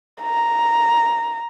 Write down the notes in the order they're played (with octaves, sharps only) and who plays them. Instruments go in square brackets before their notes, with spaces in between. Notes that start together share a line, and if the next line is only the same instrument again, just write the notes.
[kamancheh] A#5